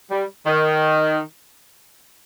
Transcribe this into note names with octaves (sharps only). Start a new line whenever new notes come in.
G3
D#3